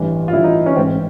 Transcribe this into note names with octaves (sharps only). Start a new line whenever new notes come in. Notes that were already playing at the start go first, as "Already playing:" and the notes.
Already playing: A1 G2 E3
F4
A1 G2 E3 E4
D#4
C#4
A1 G#2 E3 C4
C4